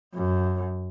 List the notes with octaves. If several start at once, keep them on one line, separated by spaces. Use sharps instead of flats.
F#2